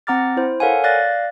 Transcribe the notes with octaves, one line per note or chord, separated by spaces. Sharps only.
C4 F#5 A#5 D6 F6 A6
E4 C5
A4 A#4 C#5 F5 F#5 G#5
D5 F5 F#6 A6 A#6